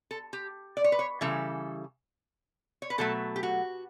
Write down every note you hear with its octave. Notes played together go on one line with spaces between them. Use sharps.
A4
G4
D5
C#5
B4
C#5
C#3 E3 G3 A4
C#5
B4
B2 F#3 A3 A4
G4
F#4